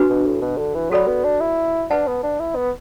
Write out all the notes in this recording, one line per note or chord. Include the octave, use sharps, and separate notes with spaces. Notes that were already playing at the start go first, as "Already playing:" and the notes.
Already playing: D4 F#4 B4
B2
A2
B2
D3
E3
F#3 F#4 A4 D5 B5
B3
D4
E4
D4 B4 F#5 A5
B3
D4
E4
B3